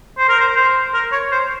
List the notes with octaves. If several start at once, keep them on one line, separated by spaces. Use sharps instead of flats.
C5
A#4
C5
C5
A#4
C#5
C5